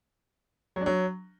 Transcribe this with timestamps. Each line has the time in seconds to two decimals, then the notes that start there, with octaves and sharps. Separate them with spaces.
0.76 F#3
0.81 D4
0.86 F#3